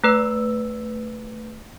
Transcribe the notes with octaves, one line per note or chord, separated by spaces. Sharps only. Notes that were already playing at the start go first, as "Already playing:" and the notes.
A3 B4 E6